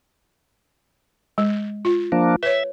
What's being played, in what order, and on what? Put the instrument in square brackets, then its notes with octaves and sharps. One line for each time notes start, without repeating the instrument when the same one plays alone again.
[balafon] G#3
F4
[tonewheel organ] F3 A#3 D4
[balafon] B4 C#5 [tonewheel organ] E5